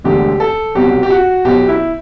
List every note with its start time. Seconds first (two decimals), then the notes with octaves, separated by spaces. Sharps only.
0.04 E1 D2 D3 G4
0.40 A4
0.75 C2 B2 F#3 G4
1.03 G4
1.10 F#4
1.45 B1 B2 F#3 G4
1.68 E4